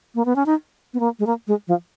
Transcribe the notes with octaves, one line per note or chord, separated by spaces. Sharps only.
A#3
B3
C#4
D#4
B3
A#3
G#3
A#3
G#3
F3